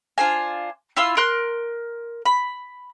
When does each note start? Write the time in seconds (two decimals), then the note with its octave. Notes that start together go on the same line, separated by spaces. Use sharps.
0.18 D4 F4 C5 G#5
0.97 E4 F4 C6 E6
1.17 A#4 C6 F#6
2.26 B5